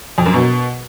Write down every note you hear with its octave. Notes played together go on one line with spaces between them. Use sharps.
F2
F#2
B2